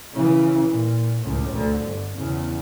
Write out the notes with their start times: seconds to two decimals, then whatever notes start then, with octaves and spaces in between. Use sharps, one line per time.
0.14 C#3 E3
0.68 A#2
1.23 C#2 A2
1.51 D2 D3
1.82 G1
2.17 E2 C#3